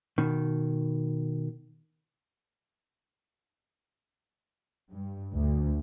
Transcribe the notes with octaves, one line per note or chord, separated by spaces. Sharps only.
B2 D#3
G2
D2